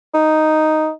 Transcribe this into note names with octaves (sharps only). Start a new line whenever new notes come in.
D#4